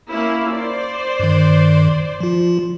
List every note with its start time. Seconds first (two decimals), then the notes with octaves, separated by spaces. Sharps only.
0.10 A#3 C#4 E4
0.54 C5 D5
1.20 G2 D#3
2.20 F3 F4